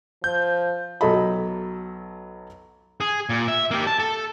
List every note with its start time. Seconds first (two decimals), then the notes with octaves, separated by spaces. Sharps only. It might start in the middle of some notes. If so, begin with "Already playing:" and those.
0.24 F3 G6
1.01 B1 F#3 A4 D#5 A5 B5
3.00 G#4
3.29 A#2
3.48 E5
3.71 A#3 G4
3.87 A5
3.99 A4